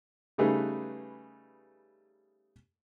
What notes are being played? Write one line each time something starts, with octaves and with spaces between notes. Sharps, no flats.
C#3 G3 A3 D#4 G#4 B4